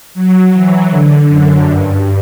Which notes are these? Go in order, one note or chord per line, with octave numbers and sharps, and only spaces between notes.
F#3
E3
D3
F#2
G2